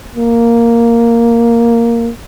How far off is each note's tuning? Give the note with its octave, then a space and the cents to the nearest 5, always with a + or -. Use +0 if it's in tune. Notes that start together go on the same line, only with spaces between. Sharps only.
A#3 +0